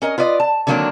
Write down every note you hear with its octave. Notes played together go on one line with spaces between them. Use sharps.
C#4 A#4 D#5
F4 B4 D5 D#5
A5
D3 D#3 F#3 A#3 C4 D4